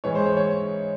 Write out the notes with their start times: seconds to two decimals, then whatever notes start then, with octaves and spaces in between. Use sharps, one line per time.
0.04 G#2 E3 G#3 C#5
0.15 C5
0.26 C#5
0.37 C#5